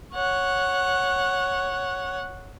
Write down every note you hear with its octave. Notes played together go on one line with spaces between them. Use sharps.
C#5 F#5